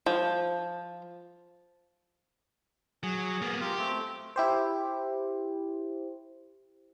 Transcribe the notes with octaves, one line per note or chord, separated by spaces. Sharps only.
F3
F#3 G#4
A#3 B3
F4 G4 A#4
A3 C4
E4 G4 C5